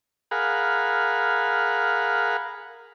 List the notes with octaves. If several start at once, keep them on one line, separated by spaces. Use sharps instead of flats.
G#4 A#4 F5 F#5 B5